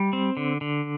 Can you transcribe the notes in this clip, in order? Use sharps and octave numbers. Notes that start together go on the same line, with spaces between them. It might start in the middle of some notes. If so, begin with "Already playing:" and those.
Already playing: G3
C4
D3
D3